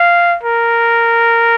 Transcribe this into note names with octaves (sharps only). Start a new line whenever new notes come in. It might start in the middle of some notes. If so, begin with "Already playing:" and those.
Already playing: F5
A#4